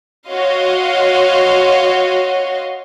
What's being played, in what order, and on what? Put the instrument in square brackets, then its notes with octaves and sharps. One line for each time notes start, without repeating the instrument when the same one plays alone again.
[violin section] F#4 C#5 D#5 F5 C6